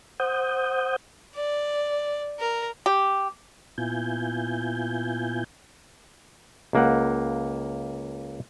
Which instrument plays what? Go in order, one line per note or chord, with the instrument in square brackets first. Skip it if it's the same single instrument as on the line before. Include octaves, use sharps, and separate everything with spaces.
[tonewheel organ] C5 F#5 D#6 G6
[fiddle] D5
A#4
[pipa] G4
[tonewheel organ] A#2 B3 E4 F4 G#5 G6
[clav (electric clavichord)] C#2 A#3 F#5